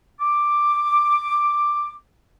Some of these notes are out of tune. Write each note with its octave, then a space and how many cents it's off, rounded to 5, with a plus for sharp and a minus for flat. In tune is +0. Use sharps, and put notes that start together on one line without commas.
D6 +5